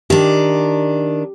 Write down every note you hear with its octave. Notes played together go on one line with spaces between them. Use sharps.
D#3 D4 G4